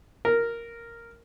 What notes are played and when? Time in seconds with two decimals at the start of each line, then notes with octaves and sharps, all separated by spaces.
0.25 A#4